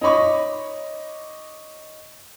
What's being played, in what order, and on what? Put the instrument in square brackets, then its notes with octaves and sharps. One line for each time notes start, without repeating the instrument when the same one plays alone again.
[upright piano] D#4 C#5 D#5 B5 C#6 D6